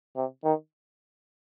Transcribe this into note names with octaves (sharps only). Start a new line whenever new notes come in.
C3
D#3